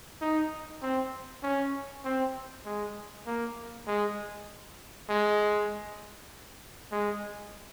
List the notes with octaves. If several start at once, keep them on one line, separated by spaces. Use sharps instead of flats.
D#4
C4
C#4
C4
G#3
A#3
G#3
G#3
G#3